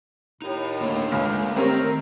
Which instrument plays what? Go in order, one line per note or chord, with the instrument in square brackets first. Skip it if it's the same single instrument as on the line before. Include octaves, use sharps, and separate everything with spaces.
[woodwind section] D#2 A2 [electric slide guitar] D#4
[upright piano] D2 [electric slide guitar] A3 A#3
[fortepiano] C#2
[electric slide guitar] D#3 A#5 [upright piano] A3 G4 C#5 [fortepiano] C4 [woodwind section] A#4